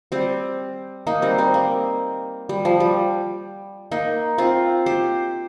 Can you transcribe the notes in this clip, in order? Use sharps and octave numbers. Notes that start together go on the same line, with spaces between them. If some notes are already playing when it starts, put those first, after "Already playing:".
G3 C4
A#3 D#4
G3 C4
G3 C4
A#3
G3
F3
G3
A#3 D#4
C4 F4
G4 C5